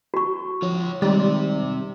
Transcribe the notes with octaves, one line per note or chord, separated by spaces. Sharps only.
F#4 C#6
F3 F4 C#5
D#3 G3 G#3 C4 D#4 G4